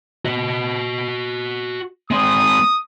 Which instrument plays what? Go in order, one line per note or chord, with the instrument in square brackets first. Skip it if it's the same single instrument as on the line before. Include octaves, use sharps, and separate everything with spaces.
[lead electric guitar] F#4 D#5
[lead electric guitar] G#3 C4 [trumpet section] D#6